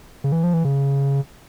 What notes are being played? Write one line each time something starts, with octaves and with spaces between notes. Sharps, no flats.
C#3
E3
F3
E3
C#3